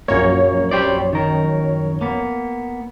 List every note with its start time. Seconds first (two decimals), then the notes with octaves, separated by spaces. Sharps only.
0.08 A#1 F#2 A#3 C#5
0.71 G4 C5 D5
1.13 D#3 A#4
2.01 A#3 B3